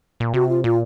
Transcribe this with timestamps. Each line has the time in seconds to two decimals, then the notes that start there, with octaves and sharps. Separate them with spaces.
0.20 A#2
0.34 C3 F#4
0.49 F4
0.64 A#2 F4